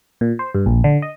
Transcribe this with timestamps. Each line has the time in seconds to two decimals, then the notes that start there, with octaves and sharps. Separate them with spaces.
0.21 A#2
0.39 C5
0.55 G2
0.66 A#1
0.84 D3
1.02 D#5